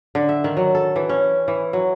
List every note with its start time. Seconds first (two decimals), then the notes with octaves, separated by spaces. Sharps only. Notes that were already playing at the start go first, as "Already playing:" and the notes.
0.15 D3
0.29 E5
0.44 D#3
0.57 F#3
0.75 A4
0.96 E3
1.09 C#4
1.48 E3
1.73 F#3